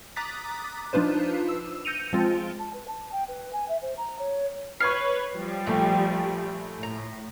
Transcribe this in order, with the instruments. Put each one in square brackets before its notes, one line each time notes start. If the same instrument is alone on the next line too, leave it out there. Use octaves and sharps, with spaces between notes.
[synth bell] A#5 D6 D#6 F#6 A6 B6
F3 D4 D#4 F4 B4 C5
E6
G6 A#6 C#7 D#7 F7
F3 G#3 C4 F4
[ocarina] A5
B4
A5
G5
B4
G#5
E5
C5
A#5
C#5
[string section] B4 C#5 [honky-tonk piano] C#6 G#6 C7 [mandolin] F6
[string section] F3 G3
[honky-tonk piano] A#1 A3 [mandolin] G4
[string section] A2 [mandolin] A#5